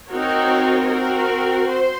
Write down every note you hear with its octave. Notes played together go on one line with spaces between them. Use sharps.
C4 D#4 F#4 A#4 C#5
C4 F#4 A#4
C5